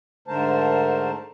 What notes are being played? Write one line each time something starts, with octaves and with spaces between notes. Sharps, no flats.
G#2 D3 A3 A#4 C5 A5